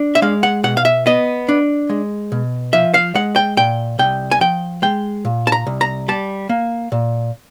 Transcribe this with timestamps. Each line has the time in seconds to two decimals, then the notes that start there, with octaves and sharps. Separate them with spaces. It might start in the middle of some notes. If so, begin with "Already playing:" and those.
Already playing: D4
0.15 E5
0.22 G#3 F5
0.43 F#5
0.64 B2 F#5
0.77 F5
0.85 E5
1.06 B3 D#5
1.49 D4
1.90 G#3
2.32 B2
2.73 F3 E5
2.94 F5
3.15 G#3 F#5
3.36 G5
3.57 A#2 G5
3.99 C2 G5
4.31 G#5
4.41 F3 G5
4.82 G#3 G5
5.25 A#2
5.47 A5
5.52 A#5
5.67 C2
5.81 A#5
6.08 G3 A5
6.49 A#3
6.92 A#2